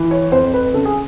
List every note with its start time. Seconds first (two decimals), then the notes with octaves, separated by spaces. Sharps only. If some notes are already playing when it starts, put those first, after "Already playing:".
Already playing: E3
0.11 C#5
0.32 F2 C5
0.54 B4
0.74 C#3 A4
0.85 G#4